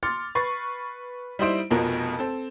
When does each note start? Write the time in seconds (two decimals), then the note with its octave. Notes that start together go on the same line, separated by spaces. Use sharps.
0.03 C6 D6 F6 A6 C#7
0.35 B4 C#6 A6 C7
1.39 G3 D#4 E4 C5 D7
1.70 F1 F2 B2 F3 A#4
2.19 C4 A4